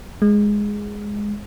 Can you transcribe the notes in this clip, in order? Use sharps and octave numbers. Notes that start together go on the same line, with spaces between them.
G#3